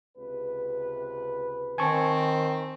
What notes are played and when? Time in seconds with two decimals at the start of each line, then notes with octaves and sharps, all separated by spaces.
0.18 C#2 C3 B4
1.78 D#3 C4 G#5 A5 C#6